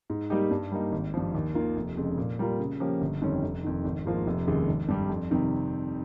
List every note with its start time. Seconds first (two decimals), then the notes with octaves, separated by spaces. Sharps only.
0.10 G#2
0.30 G3 A#3 D#4 G4
0.51 G2
0.72 G3 A#3 D#4
0.92 G#1
1.14 G2 F3
1.35 D#2
1.54 D#3 A#3 F4
1.77 F1
1.97 F2 C#3 G#3
2.18 A#2
2.39 G3 A#3 F4 A#4
2.60 C#3
2.80 F3 A#3 C#4 G4
3.01 G1
3.22 F2 D#3 G3 C#4
3.43 F1
3.64 F2 D#3
3.85 G#1
4.05 G#2 F3 A#3 F4
4.27 F1
4.47 D#2 C#3 G#3
4.67 G#1
4.88 G2 G3
5.09 F2
5.31 C3 D#3 G3